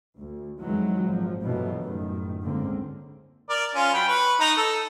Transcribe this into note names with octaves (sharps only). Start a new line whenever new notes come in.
D2
F2 D#3 E3 F#3 G#3
G#1 A#2 F3
G2 B2 E3 F#3 A3
G1 F#2 A2 D#3
C#2 G#2 D3 A#3 C4
A#4 D5
C#4 F4
F#3 G5 B5
B4 C#6
D#4 A#5
A4